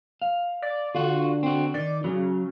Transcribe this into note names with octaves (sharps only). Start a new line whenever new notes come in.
F5
D5
D3 F4 F#4
C4 F#4
D#3 D5
C#3 F#3